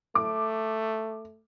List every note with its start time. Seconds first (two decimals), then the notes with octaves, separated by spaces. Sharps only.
0.15 A3 D6